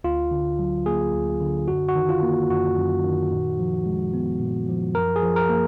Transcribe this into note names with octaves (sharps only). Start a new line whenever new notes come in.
D2 F4
D3
F#3
A#3 G#4
D2
D3
F#2 F#4
F#4
D#3
F4
A#3
F#2 F#4
F#2
D#3
A#2
F3
G#3
B3
A#2
F3
F#2 A#4
G#4
F3
A#4
A#3